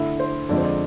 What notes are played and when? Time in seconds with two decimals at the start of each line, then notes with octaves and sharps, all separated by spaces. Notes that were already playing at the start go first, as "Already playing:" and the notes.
Already playing: D3 A3 E4 E5
0.20 C5
0.49 F2 D3 F3 G#3 D5
0.58 C5
0.64 D5